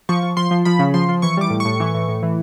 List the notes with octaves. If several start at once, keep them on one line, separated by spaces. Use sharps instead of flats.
F3 C#6
F3
F3 C6
F3
F3 B5
C#3
F3 C6
F3
E3 C#6
G3 D6
A2
C#6
A2
E3
A2
A2
E3